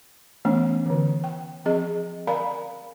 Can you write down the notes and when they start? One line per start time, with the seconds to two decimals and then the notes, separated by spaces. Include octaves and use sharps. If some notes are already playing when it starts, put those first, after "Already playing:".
0.45 E3 A3 B3 C#4 D4
0.86 D3 E3
1.24 G5
1.65 F3 C4 G#4 D#5
2.27 A#4 D5 F5 G#5 A#5 B5